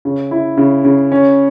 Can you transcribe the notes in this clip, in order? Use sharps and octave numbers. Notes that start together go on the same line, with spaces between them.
C#3
E4
C#3
C#3
C#4